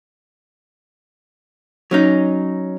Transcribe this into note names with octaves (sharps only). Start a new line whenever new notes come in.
F#3 C#4 D#4